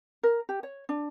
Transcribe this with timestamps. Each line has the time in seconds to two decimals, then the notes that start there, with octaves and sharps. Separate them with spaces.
0.23 A#4
0.49 G4
0.63 C#5
0.89 D4